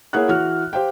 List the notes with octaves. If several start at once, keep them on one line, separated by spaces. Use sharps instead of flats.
A#3 E4 G#4 C#5 F#5 F#6
E3 F#4 F6
G4 C5 F5 G5